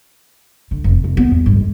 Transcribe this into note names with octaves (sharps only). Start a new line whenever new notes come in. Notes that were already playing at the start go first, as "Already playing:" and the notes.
D3
F1
F1
B3
E2
G2
G#3